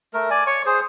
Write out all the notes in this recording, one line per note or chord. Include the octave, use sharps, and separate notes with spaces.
A3 A#4
D5 G#5
C#5 C#6
G#4 C5